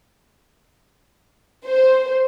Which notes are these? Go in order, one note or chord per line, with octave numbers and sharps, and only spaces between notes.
C5